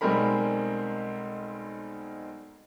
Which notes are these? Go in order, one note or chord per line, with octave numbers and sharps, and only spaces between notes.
B1 G3 G#3 C4 A#4 B5